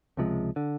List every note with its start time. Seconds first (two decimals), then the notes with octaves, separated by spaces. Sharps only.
0.17 C#2 C3 F3 G#3
0.56 D3